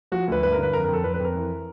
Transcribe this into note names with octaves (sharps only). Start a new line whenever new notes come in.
F3 F#4
D2 B4
G2 B4
D3 A#4
B4
F2 A#4
F2 A#4
A4
F2 B4
B4
F2 A#4
E3